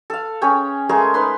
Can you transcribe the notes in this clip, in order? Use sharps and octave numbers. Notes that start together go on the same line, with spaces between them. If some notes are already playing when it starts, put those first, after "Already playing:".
A4 F5
C#4 G#4 C#5 G5
G#3 A3 G#4 A#4
D#4 B4 C6